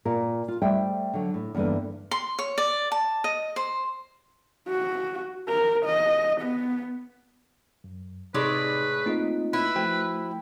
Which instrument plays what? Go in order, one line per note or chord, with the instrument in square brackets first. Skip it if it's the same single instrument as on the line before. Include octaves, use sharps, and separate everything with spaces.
[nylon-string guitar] A#2 F4 A#4
F4
G3 A3 C5 E5 G5
D3 F#3
A2
E2 G2 D3 A#3 B4
[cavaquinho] C6
C#5
D5
A5
D#5
C5
[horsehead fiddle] F#4
A#4
D#5
B3
[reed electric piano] F#2
[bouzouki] A2 G#3 D5 [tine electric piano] C3 [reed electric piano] D#4 D6 [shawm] B4
[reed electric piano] A3 A#3 D#5 [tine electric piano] C4 D#4 F4
[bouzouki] E4 [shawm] B4
[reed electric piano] F3 A3 [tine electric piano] F#4 C5 G5